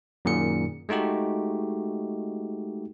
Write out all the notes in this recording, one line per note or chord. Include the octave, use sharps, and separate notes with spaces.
F#2 A#2 D#3 G#4 C#7
G#3 A3 D#4 F#4 G4